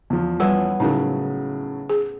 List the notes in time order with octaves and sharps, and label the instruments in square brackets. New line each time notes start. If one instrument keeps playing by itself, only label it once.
[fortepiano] E2 F3
[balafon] G3 [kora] B3 C#4 E4
[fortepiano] A2 C#3 F#3 [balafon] D#4 A#4
[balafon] G#4